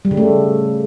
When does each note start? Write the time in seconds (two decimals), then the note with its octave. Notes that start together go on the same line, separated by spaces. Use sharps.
0.05 G3
0.11 C#3
0.17 A3